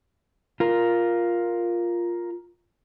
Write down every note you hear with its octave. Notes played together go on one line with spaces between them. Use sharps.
F4 A#4